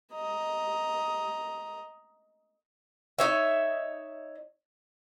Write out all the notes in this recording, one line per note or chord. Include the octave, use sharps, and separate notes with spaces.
D#5 A#5
D#4 C#5 E5